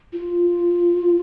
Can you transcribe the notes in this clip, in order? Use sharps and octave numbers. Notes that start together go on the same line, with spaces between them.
F4